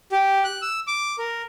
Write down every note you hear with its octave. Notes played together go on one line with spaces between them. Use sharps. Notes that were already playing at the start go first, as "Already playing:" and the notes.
G4
F#6
E6
D6
A#4